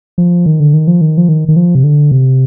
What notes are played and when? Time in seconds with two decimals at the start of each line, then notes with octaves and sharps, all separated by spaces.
0.18 F3
0.46 D#3
0.60 D3
0.73 D#3
0.87 F3
1.01 D#3
1.18 F3
1.29 D#3
1.48 D#3
1.56 F3
1.75 C3
1.84 D3
2.12 C3